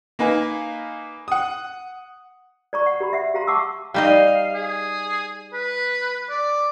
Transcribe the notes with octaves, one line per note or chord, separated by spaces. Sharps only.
A#3 D#4 B4 F5 G#5
F#5 D#6
D5 A#5 C#6
F#5
G4 A#5 B5
E5 F#5
G4 F5 A#5 C6
F#5 A5 C#6 D6 E6
G3 D#4 D#5 F5
G#4
B4
D5